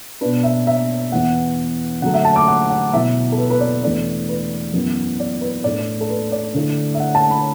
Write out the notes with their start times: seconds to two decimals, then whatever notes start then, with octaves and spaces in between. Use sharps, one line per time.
0.21 B2 B3 D4 B4
0.43 E5
0.67 E5
1.12 E2 E3 B3 F#5
2.02 D3 F#3 A3 F#5
2.14 E5
2.25 A5
2.36 D6
2.48 F#5
2.70 F#5
2.93 B2 F#3 B3 E4 E5
3.32 A4
3.38 B4
3.50 B4
3.61 D5
3.83 E2 E3 A3 D4 D5
4.29 B4
4.73 F#2 E3 B3 E4
5.20 D5
5.41 B4
5.64 A2 A3 D4 D5
6.01 A4
6.09 B4
6.32 D5
6.54 D3 A3 E4
6.94 E5
7.00 F#5
7.15 A5
7.30 B5